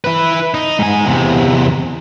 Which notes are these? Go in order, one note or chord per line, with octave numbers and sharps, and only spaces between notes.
E4 B4
D#4
G#2 G#5
E2 C3